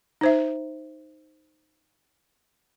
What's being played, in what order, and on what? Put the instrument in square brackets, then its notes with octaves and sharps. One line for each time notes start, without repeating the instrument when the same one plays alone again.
[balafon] D#4 C5 E5